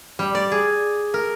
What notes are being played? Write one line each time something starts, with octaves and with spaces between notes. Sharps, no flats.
G3
D5
G#4
A#4